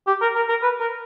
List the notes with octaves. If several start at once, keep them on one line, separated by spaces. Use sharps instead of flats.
G4
A#4
A#4
A#4
B4
A#4